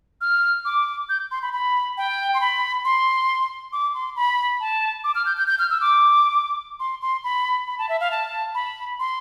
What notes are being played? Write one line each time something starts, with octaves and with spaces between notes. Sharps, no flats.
F6
D6
G6
C6
B5
B5
G5
C6
B5
C6
D6
C6
B5
A5
D6
F6
G6
G6
G6
F6
E6
D6
C6
C6
B5
B5
A5
E5
F5
A5
B5
C6